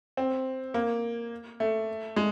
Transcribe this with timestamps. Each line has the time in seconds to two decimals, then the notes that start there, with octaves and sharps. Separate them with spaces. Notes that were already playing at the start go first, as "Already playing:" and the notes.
0.17 C4
0.74 A#3
1.60 A3
2.16 G#3